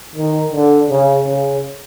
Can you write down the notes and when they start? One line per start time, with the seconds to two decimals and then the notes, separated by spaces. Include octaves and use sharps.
0.16 D#3
0.53 D3
0.90 C#3
1.28 C#3